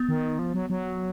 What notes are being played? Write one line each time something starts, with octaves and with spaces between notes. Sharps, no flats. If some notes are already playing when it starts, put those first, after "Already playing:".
Already playing: B3
D#3
F3
F#3
F#3